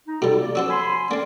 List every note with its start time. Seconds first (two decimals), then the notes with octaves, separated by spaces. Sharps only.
0.08 D#4
0.22 B2 G3 F4 A4
0.41 A#3 D5
0.55 F3 C#4 F#4 C5 E6
0.70 G#5 B5 C6
1.11 A#3 C4 C#4 A4 D5